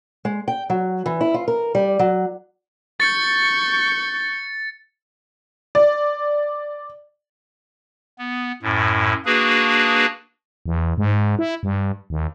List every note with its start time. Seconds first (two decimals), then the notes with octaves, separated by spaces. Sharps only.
0.25 G#3
0.48 G5
0.70 F#3
1.06 E3
1.21 E4
1.34 F4
1.48 A#4
1.75 G3
1.99 F#3
3.00 C#6 G6 A6 C#7
5.75 D5
8.18 B3
8.63 F#2 A2
9.26 A#3 D4 F#4 G#4 B4
10.66 E2
10.98 G#2
11.39 E4
11.63 G2
12.10 D#2